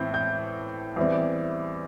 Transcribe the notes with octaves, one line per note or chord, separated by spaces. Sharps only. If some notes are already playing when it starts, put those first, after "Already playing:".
Already playing: A2 E3 C4 G6
G6
E2 E3 G3 C4